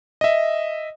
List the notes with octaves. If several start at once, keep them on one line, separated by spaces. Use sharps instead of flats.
D#5 E5